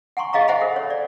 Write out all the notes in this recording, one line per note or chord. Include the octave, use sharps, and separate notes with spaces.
F#5 G#5 A#5 C6 C#6
G#4 D#5 F5 A#5 C#6
C5 E5 F#5 G#5 A#5 B5
A4 F#5
C#5
D5